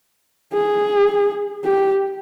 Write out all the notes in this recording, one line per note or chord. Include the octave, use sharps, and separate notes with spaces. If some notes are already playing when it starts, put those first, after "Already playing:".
G#4
G4